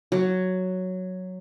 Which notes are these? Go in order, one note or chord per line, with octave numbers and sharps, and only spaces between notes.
F#3